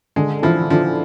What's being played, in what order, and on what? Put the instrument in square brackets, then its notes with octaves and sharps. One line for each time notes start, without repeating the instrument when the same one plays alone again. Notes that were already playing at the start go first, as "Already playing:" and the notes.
[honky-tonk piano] D3 D4 [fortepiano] G#3
[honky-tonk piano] E3 E4 [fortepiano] F3
[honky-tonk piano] D3 D4 [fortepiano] F3